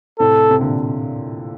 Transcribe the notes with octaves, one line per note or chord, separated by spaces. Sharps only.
A2 C3 A4
C3
A#2 D3